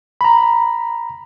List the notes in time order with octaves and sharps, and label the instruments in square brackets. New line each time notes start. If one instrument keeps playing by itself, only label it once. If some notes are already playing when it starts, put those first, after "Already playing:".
[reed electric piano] A#5 B5